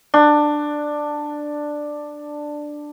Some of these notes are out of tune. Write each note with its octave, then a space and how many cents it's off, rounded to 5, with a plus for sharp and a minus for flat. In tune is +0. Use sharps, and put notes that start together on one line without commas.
D4 +10